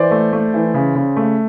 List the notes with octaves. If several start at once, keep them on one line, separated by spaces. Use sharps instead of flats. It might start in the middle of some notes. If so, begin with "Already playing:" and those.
Already playing: E3 C5 D5
A3
A3
E3
C#3
C#3
A3